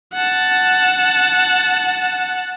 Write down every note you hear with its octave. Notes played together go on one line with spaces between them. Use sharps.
F#5 A5